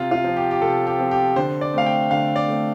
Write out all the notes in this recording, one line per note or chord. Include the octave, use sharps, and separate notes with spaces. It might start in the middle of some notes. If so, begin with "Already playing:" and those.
Already playing: C3 F4
F4
F3 C4
G4
G4
C3 A4
G4
F3 C4
G4
D3 C5
D5
A3 C4 F5
G5
D3 F5
D5
A3 C4